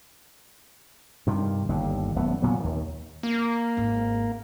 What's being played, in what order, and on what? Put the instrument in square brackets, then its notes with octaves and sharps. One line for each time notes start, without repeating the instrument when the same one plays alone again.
[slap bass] G2 C3 D#3
G1 D#2 D3
D#1 F#2 A3 B3
A#2 F#3 B3
D#2 D#3
[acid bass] A#3
[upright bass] G#1 G#2